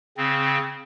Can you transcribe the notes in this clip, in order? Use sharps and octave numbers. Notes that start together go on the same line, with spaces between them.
C#3 C4